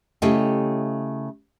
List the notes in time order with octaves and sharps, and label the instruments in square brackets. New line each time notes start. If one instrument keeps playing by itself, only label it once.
[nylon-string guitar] C#3 A3 E4 G4 D#5 G5